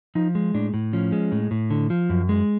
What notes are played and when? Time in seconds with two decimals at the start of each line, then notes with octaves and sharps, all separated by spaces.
0.15 F3 D#4
0.35 G#3
0.54 A2 D4
0.74 A2
0.93 F3 C#4
1.12 G#3
1.32 A2
1.51 A2
1.70 D3
1.90 F3
2.09 F#2
2.29 G#3